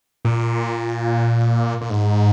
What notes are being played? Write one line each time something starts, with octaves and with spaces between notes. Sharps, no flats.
A#2
A#2
G#2